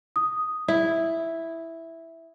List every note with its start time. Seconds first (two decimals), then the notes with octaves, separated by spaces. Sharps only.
0.16 D#6
0.68 E4